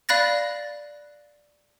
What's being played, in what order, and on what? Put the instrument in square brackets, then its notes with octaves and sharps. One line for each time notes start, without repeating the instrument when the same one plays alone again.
[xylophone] D5 F5 B5 F#6 A6 A#6